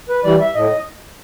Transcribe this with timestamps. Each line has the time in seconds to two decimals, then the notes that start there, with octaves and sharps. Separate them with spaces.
0.09 B4
0.24 E3 G3 D5
0.40 E5
0.55 A2 D#5